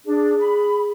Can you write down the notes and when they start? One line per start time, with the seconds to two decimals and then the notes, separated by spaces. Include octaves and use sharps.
0.06 D4 G#4
0.39 B5